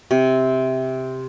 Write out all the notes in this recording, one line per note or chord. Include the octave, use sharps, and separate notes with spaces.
C3